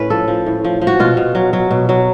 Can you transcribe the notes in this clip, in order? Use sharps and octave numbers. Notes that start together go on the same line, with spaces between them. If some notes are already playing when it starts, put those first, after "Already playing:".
Already playing: A2 C#4 B4
F3 A4
F3
A2
F3
F3
F#4
B2 F4
B2
F#3
F#3
B2
F#3